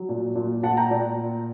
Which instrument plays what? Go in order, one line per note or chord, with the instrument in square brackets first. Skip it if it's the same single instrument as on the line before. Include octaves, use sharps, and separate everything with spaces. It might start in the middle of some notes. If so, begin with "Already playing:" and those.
Already playing: [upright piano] F#3
A#2
A#2
A#2 F#5 A5
G5 A#5
A#2 D5